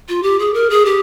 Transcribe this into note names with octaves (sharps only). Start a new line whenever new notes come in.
F4
G4
G#4
A#4
G#4
G4